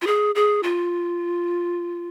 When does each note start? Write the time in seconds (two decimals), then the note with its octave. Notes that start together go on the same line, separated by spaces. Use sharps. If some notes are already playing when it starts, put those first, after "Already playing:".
0.02 F4
0.07 G#4
0.35 G#4
0.63 F4